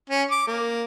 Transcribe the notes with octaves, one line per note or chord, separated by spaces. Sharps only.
C#4
D6
A#3